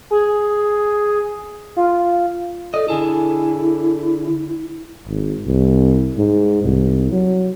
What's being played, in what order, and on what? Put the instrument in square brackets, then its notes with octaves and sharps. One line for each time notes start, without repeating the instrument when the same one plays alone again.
[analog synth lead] G#4
F4
[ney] A4 [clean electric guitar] D5 D#5
[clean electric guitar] D3 G#4 A4 [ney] E4
[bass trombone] G#1
C2
G#2
C2
F#3